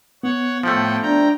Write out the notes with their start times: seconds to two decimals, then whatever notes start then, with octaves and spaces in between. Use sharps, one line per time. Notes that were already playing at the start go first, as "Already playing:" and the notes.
0.23 B3 C#5 F#5
0.63 A2 F3 A3 F#5 G5
1.02 D4 G5 A#5